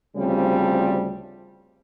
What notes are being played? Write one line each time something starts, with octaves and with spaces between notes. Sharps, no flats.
D2 C#3 F3 G3 C4